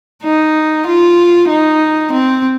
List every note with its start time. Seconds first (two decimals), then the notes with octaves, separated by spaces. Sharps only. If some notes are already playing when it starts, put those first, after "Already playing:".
0.24 D#4
0.87 F4
1.49 D#4
2.12 C4